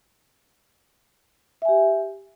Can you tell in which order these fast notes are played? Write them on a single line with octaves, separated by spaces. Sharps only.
E5 G#5 G4